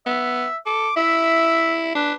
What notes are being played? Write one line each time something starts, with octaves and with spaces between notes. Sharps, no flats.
B3 E5
A4 D6
E4 E5
D4 B4